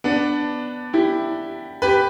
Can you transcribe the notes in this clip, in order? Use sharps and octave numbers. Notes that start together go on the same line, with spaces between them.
B3 D4
E4 G4
G4 B4